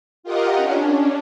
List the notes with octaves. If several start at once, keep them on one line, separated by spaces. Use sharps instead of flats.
F4 G4 A#4 D#5 F#5
C#4 D4